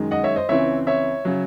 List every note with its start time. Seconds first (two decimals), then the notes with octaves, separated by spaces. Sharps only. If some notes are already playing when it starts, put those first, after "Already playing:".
Already playing: F#2 D#3 G#3
0.11 D#5 F#5
0.24 C#5 E5
0.36 C5 D#5
0.48 C#2 C#3 E3 C4 C#5 E5
0.87 C#5 E5
1.25 C#3 F#3